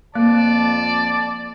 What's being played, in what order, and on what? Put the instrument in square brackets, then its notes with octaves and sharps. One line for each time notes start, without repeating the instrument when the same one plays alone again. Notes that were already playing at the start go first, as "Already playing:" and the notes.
[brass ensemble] F2 A5 [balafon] A#3 [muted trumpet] D5